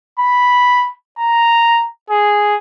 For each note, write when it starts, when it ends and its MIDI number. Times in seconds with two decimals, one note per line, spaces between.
0.19 0.91 83
1.19 1.85 82
2.10 2.57 68